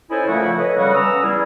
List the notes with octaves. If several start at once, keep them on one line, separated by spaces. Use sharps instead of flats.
C#4 E4 A4 C5 D#5 G#5
A#2 C#3 F3 A3 E4 F#4
A4 B4 C#5 D#5
C#3 G3 F#4
B3 C#4 A#5 D#6 E6
E2 G3 B3 E4 G#4